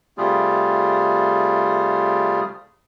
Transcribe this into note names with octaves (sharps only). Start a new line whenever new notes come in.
C3 G3 A3 F4 G#4